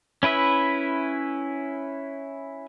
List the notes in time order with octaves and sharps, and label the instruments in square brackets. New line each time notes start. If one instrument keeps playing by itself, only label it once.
[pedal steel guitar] C#4 E4 B4 E5